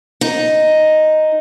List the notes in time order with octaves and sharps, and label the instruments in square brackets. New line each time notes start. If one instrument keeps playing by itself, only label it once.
[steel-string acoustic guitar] D#4